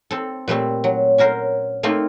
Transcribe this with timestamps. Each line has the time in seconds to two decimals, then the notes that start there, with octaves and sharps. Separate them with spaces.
0.11 C4 A4
0.48 A#2 G3 A3 C4
0.84 F#3
1.18 C#4 F#4 A#4 C5
1.83 A3 A#3 C4 D#4 F4